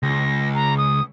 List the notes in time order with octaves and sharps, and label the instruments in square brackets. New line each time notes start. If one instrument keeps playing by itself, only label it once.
[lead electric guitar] C#2 [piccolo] A#6
[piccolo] A#5
D#6